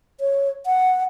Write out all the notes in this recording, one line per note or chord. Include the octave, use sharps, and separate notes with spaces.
C#5
F#5